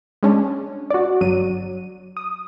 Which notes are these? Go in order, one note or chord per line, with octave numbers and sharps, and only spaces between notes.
G#3 C#4 D4
F#4 D5
G1 F#3 D#7
D#6